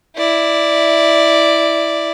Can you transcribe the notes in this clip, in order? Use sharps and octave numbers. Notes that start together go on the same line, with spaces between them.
E4 D5